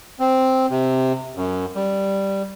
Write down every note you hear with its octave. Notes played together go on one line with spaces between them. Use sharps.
C4
C3
F#2
G3